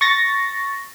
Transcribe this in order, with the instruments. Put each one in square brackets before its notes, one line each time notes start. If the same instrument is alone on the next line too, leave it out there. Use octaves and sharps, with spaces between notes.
[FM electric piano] C#6 A6 A#6